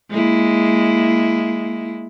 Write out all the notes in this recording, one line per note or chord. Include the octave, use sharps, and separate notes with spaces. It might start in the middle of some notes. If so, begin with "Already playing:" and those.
G#3 A#3 E4